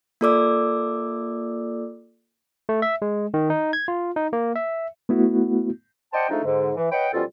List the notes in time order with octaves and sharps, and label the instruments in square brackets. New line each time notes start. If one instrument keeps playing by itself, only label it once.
[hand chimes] A#3 F4 A4 D5 D6 E6
[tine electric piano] A3
E5
G#3
D#3
D#4
G#6
F4
D#4
A#3
E5
[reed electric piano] A3 B3 E4 F#4
[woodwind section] C5 D5 D#5 F#5 G5 A5
F3 G#3 A3 D4 D#4
G#2 D3
E3
B4 C#5 D#5 F#5 G5
B2 F3 G3 C#4 F4 A4